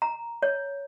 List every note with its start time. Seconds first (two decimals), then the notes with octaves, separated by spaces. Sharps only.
0.02 A#5
0.42 C#5